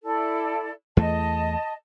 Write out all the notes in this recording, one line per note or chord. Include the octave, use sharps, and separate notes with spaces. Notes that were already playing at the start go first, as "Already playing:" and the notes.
E4 A4 D5
E2 A3 D#5 A5